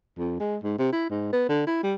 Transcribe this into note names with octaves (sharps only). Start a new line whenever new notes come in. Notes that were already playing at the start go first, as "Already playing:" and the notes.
F2
G#3
G#2
C3
E4
G#2
B3
D3
E4
G3